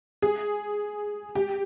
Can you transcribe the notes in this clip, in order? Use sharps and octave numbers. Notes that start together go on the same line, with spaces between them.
G#4
G4